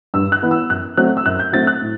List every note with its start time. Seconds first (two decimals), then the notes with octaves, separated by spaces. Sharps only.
0.14 G2 E6
0.32 F#6
0.42 E3 B3
0.51 E6
0.70 F#2 F#6
0.97 F#3 A3 C4 F#6
1.17 E6
1.26 F#2 F#6
1.39 G6
1.53 F#3 A3 C4 A6
1.67 F#6
1.82 A2